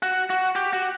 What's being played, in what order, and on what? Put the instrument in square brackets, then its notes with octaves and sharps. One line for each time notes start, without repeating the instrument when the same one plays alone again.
[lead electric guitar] F#4
F#4
G4
F#4